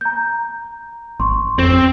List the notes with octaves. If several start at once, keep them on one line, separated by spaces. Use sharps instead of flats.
A#5 G6
G#1 C6 C#6
F2 C4